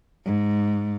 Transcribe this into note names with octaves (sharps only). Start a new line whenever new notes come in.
G#2